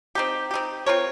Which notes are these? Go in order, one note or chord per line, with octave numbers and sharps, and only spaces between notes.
C4 D#4 G4
C4 D#4 G4
C4 F4 A#4 C#5